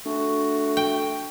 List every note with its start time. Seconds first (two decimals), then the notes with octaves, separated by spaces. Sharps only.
0.06 A3 D4 F#4
0.77 G5